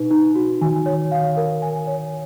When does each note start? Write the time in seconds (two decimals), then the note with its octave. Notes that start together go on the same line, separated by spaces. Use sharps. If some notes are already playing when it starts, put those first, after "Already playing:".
Already playing: B2 D#4 B4
0.11 D#4
0.35 F#4
0.62 D#3 G#5
0.86 C#5
1.11 F5
1.37 A#4
1.62 G#5
1.87 C#5